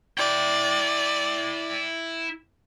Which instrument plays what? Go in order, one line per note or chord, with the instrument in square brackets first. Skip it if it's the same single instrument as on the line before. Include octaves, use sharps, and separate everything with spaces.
[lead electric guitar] E4 G5 [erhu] D5